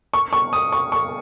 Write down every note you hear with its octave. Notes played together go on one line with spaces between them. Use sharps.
C#6
C#6
D#6
C#6
C#6